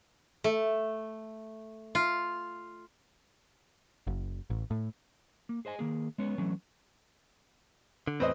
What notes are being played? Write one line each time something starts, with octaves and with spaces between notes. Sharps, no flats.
A3
F4
F#1
A1
A2
A#3
G#4 C5 D#5 G#5
D#3 A#3 G#4
G#3 B3 C#4 C#5
E3 F#3 A3 C#4
D3
E2 A2 C4 B4 C5 D#5